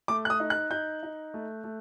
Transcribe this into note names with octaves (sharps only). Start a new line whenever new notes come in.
A3 D6
F#6
D#6
D#4
F#6
D#4 G6
D#4
A3
A3